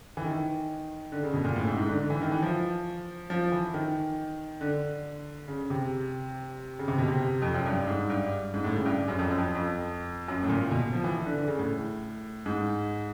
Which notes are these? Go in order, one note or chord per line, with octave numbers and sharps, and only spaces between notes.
E3
D#3
D3
C#3
B2
A#2
A2
G#2
G#2
D3
D3
E3
D#3
E3
F3
F3
E3
D#3
D3
C#3
C3
C#3
C3
B2
C3
F2
F#2
G2
G#2
G2
G#2
A2
C#3
G2
F#2
F2
F#2
F2
F2
F#2
A2
A#2
B2
F3
E3
D3
D3
C#3
A2
G#2